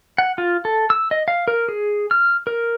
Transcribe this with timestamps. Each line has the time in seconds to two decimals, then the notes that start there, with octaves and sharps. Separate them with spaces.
0.18 F#5
0.38 F4
0.65 A4
0.90 E6
1.11 D#5
1.28 F5
1.48 A#4
1.69 G#4
2.11 F6
2.47 A#4